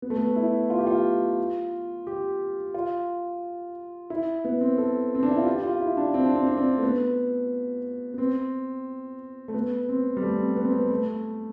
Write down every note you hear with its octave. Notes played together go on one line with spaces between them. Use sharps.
B3
A3
B3
E4
F4
G4
F4
G4
F4
E4
B3
C4
A4
C4
D4
E4
F4
G4
F4
E4
D4
C4
D4
C4
D4
C4
A3
B3
B3
C4
A3
B3
C4
G3
A3
C4
B3
C4
B3
A3